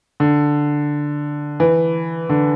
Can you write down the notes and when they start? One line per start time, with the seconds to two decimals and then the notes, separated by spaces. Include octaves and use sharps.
0.20 D3
1.60 E3
2.29 D3